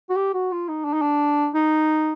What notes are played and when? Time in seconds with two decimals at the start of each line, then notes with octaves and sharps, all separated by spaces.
0.10 F#4
0.16 G4
0.34 F#4
0.52 F4
0.68 D#4
0.85 D4
0.94 D#4
1.02 D4
1.54 D#4